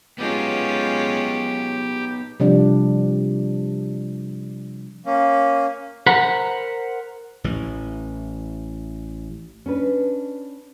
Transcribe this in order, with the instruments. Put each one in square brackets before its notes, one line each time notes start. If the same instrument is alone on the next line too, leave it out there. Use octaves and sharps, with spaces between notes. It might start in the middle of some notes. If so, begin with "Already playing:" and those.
[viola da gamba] G#3 C#4 F4 [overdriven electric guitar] B3 D#4 [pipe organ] G4
[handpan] C3 F3 G3 D4
[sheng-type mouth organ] A#3 C#4
[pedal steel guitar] A#4 C5 F#5 B5
[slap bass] A1 E3
[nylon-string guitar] C#4 D4 B4